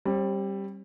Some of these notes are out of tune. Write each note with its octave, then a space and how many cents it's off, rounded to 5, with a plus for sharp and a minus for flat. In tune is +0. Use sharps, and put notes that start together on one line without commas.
G3 +0 C4 +40